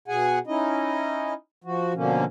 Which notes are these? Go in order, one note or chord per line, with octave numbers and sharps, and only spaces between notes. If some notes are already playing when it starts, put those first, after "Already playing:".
B2 G#4 F#5 G#5
C#4 D#4 E4 D#5
F3 F#4
B2 D3 F3 A#3 C#4